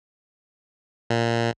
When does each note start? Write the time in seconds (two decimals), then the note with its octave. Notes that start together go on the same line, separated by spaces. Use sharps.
1.10 A#2